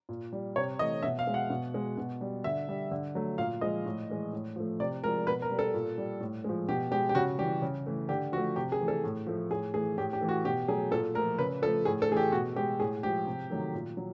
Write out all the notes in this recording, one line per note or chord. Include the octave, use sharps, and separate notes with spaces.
A#2
G3
C3 C#5
E3 A3 D#5
B2 E5
F5
G#3
F#5
B2
G#3
B2
G3
D3 E5
G3
D3
F#3 A3
A#2 F5
F3 G#3 D#5
A2
E3 G#3
A2
F3 A3
C3 D5
F3 G#3 A#4
B2 B4
A#4
G3
A4
A#2
G3
A2
F3 G#3
B2 G4
G#3 G4
G4
C#3 F#4
E3 G3 G4
C#3
E3 A3
D3 G4
F3 F#4
A3
C3 G4
G#4
E3 A3
A4
A2
F3 A3
A2 G#4
E3 A3 G#4
A2 G4
G4
E3 A3
F#4
B2 G4
F#3 A3 G#4
A#2 A4
F3 A3 A#4
C#3 B4
F3 A3 A4
A2 G#4
A4
E3 A3 G#4
G4
B2 F#4
G#3 G4
A2 G#4
F3 G#3 G4
C3
D#3 F#3 A3
A#2
F#3